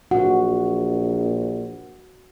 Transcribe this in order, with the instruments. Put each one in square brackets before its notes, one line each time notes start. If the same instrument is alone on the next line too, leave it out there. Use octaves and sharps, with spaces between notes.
[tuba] A#1 [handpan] F#4 [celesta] F#5